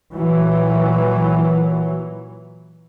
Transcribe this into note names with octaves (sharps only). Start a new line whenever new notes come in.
A#2 E3 F#3